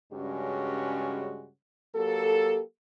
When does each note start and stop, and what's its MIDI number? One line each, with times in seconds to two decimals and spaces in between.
0.13 1.49 43
0.13 1.49 49
0.13 1.49 55
0.13 1.49 56
0.13 1.49 61
0.13 1.49 66
1.96 2.61 54
1.96 2.61 58
1.96 2.61 67
1.96 2.61 69